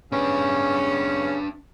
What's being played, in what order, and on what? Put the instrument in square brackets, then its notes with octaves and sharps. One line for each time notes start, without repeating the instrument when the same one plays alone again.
[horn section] C#3 B3 C#4 [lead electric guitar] D4 B4